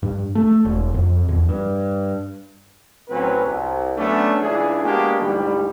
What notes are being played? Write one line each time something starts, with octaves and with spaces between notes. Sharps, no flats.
G2
A3
E1
F2
E2
G2
A1 F#3 C4 C#4 B4
C2
F#3 A3 B3 C#4 D4
C#2 E3 D4 G#4
G#3 A#3 B3 D4 F#4 G4
D2 G#2 E3 G3